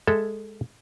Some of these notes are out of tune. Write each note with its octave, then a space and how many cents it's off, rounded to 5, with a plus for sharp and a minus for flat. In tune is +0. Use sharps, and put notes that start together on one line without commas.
G#3 -5 A4 +0 E5 +0